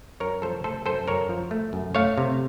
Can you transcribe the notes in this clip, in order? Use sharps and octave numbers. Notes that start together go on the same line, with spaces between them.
F#2 A#4 C#5
F3 A4 C5
A3 A4 C5
F#2 A4 C5
F#2 A#4 C#5
F3
A3
F#2
A3 C#5 F5
C3